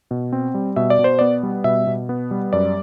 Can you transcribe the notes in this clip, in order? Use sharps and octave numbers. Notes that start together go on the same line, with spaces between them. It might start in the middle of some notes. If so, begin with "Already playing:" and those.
B2
C4
G3
B2 E5
D5
B2
C5
B3 D5
G3
B2 E5
B2
B3
G3
F#2 D5